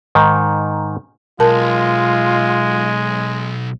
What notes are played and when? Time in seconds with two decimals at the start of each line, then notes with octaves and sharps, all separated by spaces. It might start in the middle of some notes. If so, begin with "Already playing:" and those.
0.15 G#2 D#3
1.40 B1 G#3 F4 A#4 A5